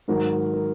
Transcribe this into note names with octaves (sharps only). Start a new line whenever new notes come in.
G#2 D#3 F#3 A#4
A#4